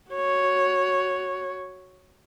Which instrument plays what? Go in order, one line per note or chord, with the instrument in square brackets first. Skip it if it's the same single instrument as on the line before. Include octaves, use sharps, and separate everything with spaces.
[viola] F#4 C#5